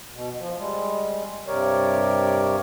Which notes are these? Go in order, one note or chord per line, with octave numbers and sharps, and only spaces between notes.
B2
F3
G3 G#3
G2 C3 G4 A#4 C#5 D5